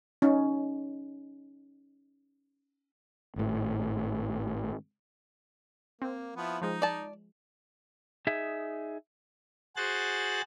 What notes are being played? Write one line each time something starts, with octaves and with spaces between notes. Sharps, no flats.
C#4 D#4
G#1 A2
A#3 C4
F3 B3 E4
F3 G#3 D#4
D5 A5
D#4 G#4 E5
F#4 G#4 C5 F#6 A6